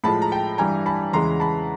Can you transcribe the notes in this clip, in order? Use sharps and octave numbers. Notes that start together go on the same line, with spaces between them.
A2 F3 G#3 A5 B5
A#5
G5 A5
G2 E3 G3 G#5 A#5
A5 B5
E2 C#3 E3 G#3 A#5 C6
A5 B5